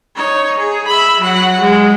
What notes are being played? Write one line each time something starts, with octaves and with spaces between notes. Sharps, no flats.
D#4 C#5
G#4
E5 B5
F#3 F#5
G#3